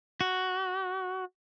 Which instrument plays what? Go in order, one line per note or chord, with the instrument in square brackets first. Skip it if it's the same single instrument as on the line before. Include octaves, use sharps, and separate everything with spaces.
[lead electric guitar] F#4